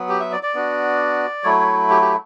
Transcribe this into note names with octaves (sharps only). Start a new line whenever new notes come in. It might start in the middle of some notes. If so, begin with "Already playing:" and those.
Already playing: F#3 B3
G4
E5
D5
D5
B3 D4 F#4
F#3 A3 E4 C#5
C#5
G4
G4